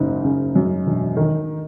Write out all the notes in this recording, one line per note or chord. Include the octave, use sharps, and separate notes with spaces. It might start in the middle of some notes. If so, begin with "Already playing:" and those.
Already playing: F#1 G#2 D#4
C#3
F#2
E1
D#3